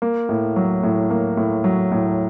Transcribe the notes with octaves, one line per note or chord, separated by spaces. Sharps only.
A#3
A2
F#3
A2
A#3
A2
F#3
A2